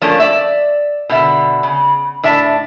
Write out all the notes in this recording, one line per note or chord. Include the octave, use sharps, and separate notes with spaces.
F3 A3 A#3 C#4 D4
D5 E5
B2 D3 E5
C#3
A2 D4 E5 A5